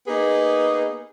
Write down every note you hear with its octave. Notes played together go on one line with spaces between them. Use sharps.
A#3 B3 D#4 G#4